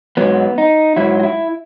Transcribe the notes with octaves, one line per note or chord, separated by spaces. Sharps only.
G#2 F#3 B3
D#4
G#2 F#3 E4
F#4
E4